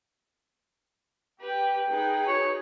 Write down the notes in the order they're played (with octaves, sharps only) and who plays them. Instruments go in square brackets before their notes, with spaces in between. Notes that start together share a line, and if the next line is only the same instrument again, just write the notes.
[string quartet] G4 B4 [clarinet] G5
[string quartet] D#4 G#4 B4
[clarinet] F#4 [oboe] C#5